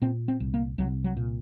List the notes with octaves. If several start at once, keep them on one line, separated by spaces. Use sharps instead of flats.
A#2 C4
C4
C2
A#3
C2 F#3
F#3
A#2